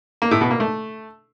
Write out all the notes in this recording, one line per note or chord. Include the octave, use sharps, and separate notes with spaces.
A#3
A2
B2
A#3
A3